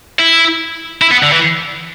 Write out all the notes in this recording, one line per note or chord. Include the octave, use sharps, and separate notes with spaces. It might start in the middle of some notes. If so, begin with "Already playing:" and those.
E4
E4
B3
D3
E3